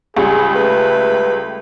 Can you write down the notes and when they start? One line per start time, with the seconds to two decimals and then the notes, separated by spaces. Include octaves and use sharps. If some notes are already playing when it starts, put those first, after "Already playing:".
0.17 C#2 G3 G#4
0.56 A3 B4